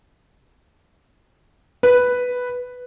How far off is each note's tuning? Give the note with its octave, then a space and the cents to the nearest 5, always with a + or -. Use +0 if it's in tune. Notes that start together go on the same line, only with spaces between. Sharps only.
B4 +0